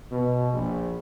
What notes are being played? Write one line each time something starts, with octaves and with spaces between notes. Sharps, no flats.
B2
A#1